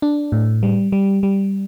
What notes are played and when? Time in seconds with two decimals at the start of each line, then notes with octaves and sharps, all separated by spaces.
0.02 D4
0.32 A2
0.63 G3
0.92 G3
1.23 G3